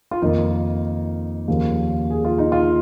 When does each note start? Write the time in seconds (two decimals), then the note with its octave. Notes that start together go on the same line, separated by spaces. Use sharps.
0.11 F4
0.22 F2 D#3 A#3 D#4
1.48 D#2 C#3 F3 A#3
2.10 G#4
2.25 F4
2.38 D#4
2.52 F4